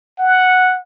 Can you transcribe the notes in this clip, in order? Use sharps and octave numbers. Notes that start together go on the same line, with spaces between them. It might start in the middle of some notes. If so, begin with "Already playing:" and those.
F#5